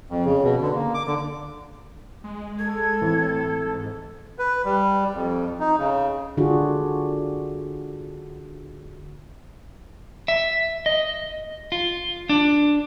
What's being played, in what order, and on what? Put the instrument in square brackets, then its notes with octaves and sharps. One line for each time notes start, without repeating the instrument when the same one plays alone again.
[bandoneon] F2
C#3
B2
D3
A#3
D6
D3
[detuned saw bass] G#3
[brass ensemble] A4 [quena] G#6
[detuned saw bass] A2 [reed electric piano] E3 C4
[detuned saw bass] G#2
[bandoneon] B4
G3
F2
D#4
C#3
[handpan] D3 D4 F4 F#4 G#4
[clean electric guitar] E5
D#5
F4
D4